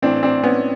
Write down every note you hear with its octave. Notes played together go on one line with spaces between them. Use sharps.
A1 A2 E3 C4 D4
C4 D4
B3 C#4